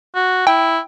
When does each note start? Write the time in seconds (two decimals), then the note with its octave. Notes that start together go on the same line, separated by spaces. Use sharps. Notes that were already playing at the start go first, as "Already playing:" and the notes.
0.15 F#4
0.47 E4 G5